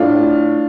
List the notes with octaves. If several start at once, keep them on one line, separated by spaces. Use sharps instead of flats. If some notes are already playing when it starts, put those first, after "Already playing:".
Already playing: A2 D4 F4